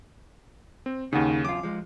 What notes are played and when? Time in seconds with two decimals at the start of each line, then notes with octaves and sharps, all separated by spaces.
0.86 C4
1.13 D#2 C#3 D#4 F#5
1.45 F#2 F4 D6
1.63 F3 G#3